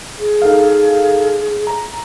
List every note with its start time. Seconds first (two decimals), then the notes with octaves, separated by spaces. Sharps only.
0.18 G#4
0.42 D#4 A4 F5
1.67 A#5